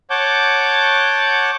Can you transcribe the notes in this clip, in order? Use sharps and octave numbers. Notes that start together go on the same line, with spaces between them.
C#5 F#5 A5 D6 G6